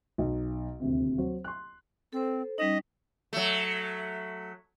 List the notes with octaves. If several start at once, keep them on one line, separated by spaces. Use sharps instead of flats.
B1
D#1 D2 C3 C4
F#3 C5
C6 F#6
C4 A4 C5
G3 C#4 D#4 D#5
F#3 A3